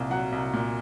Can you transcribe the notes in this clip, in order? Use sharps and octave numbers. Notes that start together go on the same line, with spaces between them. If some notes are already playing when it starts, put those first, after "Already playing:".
Already playing: C2 A#2 F5
F#3 F#5
C2
A#2